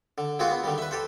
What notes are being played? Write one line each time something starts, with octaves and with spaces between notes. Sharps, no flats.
D3
G#3 A#3 C4 F4 F#4 G#4
B3
D3 D#3 G3
B4 E5
G4 A4 C5